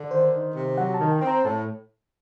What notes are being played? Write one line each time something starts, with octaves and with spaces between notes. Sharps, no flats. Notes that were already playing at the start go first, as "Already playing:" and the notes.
Already playing: D3
D#3 C5
D#3
C3
F#3 F#5
A5
D#3
G5
C4
A#5
A2 A5